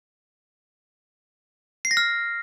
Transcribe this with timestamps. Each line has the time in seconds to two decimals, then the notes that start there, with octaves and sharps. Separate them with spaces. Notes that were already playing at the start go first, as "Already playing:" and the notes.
1.85 C7
1.91 A#6
1.97 F6